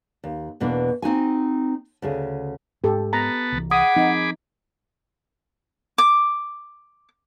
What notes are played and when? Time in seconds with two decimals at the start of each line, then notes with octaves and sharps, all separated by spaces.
0.24 D#2
0.60 E2 B2 E3 A#3 D4
1.02 C4 D#4 F#4 G#5
2.02 D2 C#3 G#4
2.84 G#2 G4 A4
3.13 B3 A5 A#5
3.52 C2 E3
3.71 G#4 F#5 B5 D6 D#6
3.96 F3 C4 D#4
5.98 D6